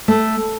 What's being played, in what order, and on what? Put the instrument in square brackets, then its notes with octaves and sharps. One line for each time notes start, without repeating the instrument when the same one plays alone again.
[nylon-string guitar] A3